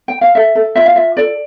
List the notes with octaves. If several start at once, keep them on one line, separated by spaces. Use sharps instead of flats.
G5
F5
A4 E5
A4
F4 E5
F5
F4 E5
A4 D5